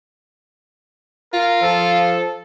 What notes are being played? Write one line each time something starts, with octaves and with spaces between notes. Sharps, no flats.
F4 A#4
F3 A4